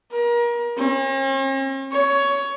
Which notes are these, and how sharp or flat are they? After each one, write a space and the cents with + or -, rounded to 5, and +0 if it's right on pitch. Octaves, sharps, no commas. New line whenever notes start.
A#4 +30
C#4 -45
C#5 +15